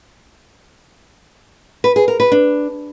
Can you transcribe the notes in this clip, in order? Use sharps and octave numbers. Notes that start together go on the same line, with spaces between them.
B4
G#4
A#4
B4
D4